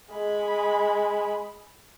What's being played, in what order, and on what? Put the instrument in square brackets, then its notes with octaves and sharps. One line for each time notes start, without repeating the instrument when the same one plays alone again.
[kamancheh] G#3 B5